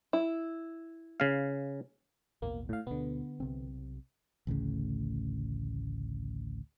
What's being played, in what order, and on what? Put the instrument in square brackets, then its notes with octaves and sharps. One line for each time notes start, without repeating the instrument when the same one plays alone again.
[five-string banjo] E4
[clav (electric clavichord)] C#3 F5
[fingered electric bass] A1 D#2 B2 [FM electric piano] A#3
[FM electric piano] A2 F5
[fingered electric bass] D2 B2 [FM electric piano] D3 B3
[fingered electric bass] B1 C3 C4
A1 D2 A2 C#3